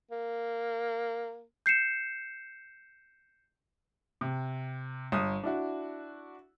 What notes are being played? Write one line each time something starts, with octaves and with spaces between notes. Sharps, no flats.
A#3
G6 C7 C#7 E7
C3
G1 D#6
D4 E4 F#4